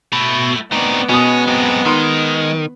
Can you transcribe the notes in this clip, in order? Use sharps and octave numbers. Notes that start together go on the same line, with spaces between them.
B2 A3 E4
A3 B3 C4 D#4 D5
B2 G#3 C#4 D#6
F#2 C4
D#3 D#4 C6